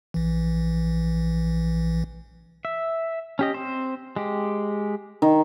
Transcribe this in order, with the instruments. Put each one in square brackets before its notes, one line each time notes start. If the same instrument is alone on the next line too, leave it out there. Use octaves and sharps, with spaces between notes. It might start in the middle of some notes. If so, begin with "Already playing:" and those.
[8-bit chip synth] A#1 E3
[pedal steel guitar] E5
C#4 G4 D#5
C4 C5
G#3 G4
[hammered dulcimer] D#3